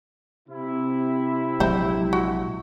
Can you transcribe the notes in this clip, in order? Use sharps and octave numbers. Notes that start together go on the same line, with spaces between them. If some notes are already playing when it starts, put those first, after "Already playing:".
C3 E4
A#1 F#3 G#3 C5 E5
F#4